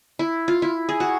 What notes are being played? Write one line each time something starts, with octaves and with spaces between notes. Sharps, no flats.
E4
F4
E4
G#4
F#4